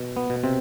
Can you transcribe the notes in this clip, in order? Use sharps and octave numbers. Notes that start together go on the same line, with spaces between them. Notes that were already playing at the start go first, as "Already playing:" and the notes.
Already playing: B2
B3
B2
C3 C4